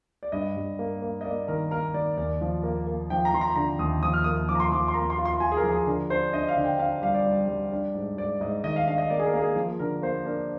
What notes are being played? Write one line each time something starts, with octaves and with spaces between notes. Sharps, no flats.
D5
G2 D#5
G2
A#3
A#3
D#5
A#3 D5
D#3 A#4
A#3 A#4
D#3 D5
D#2 D5
F3
A#3
A#3
F3 G5
A#5
F3 C6
A#5
D3 A#5
D#2 D#6
F3 D#6
F6
A#3 D#6
F3 D6
A#5
C6
F3 D6
C6
A#3 A#5
C6
F4
C6
F4 G#5
G#4
A#4
F3
G#4
D3 A#4
D4 C5
D4 D#5
F5
D3
G5
D4 F5
G3 F5
D5
G3
G3
D4
G#2
G#2 D5
G#2 D#5
D#3 D#5
F5
D4 F5
D#5
A#3 D5
G#4
A#4
A#3
G#4
F3 A#4
D3 A#4
A#3 C5
D4 A#4